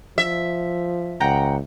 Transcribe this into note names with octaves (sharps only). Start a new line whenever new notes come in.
F3 E5
C#2 F#5 G5 A#5